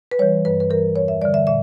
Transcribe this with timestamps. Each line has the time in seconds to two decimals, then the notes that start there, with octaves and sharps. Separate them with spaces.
0.11 B4
0.19 E3 G3 C#5
0.45 G2 B4
0.60 B4
0.70 E3 G3 A#4
0.95 E2 C#5
1.08 E5
1.22 D3 G3 D5
1.34 E5
1.47 A#2 E5